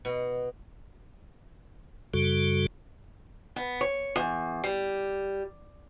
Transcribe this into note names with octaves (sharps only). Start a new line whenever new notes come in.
B2
F#2 C#3 G3 F#4 A4
B3
C#5
E2
G3